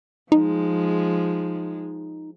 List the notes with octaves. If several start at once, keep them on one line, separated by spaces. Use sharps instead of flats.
F3 G#3 D#4